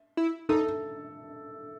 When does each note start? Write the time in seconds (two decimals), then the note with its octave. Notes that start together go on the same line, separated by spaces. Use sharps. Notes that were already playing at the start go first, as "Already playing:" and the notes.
0.17 E4
0.49 D#4 A4